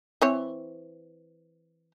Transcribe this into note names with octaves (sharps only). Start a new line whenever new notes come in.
E3 C4 C#5